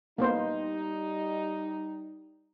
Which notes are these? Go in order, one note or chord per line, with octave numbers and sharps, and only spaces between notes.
G3 A#3 B3 D#4 C5